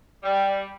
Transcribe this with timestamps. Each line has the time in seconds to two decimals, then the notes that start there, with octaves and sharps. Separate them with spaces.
0.23 G3